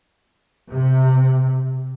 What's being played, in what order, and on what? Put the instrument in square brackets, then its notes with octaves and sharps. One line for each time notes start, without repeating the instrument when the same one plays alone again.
[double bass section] C3